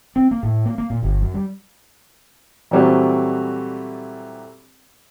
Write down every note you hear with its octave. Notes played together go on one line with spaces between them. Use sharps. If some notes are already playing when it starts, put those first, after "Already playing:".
C4
A#3
A2
A#3
A#3
A#2
G1
F#2
G3
A#2 E3 F#3 G3 A3 C4